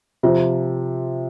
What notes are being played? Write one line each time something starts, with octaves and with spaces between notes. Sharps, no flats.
C3 F3 C4 F4